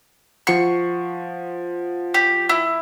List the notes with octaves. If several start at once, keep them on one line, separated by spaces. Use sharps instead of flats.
F3 F#5 C#6 C7
G4
E4